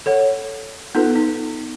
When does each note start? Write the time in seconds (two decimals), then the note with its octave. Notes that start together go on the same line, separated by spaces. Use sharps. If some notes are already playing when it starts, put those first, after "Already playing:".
0.06 A4 C#5 F#5
0.95 B3 D#4 F4 A4 B4
1.16 D#4